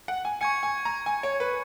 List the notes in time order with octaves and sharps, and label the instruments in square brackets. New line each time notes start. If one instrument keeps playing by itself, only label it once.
[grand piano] F#5
G#5
[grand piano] G#5 [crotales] C#6 G#6 C#7
[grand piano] G#5
A#5
G#5
C#5
B4